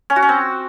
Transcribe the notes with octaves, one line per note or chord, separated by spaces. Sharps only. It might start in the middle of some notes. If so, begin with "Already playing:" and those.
C#4
F#4
C#4
C4